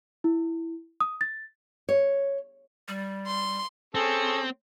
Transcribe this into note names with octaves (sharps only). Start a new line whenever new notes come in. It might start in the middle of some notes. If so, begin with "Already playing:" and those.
E4
D#6
A6
C#5
G3
C6
C4 C#4 G#4 A4